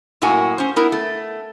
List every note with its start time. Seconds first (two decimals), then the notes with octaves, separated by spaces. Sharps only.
0.22 F#2 A2 A#3 F#4 G#5
0.58 C#4 C5
0.76 B3 E4 A#4
0.92 A3